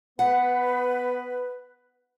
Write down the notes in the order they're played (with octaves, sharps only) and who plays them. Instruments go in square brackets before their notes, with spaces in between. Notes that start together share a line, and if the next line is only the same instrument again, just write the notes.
[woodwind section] B3 B4 [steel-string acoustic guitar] F#5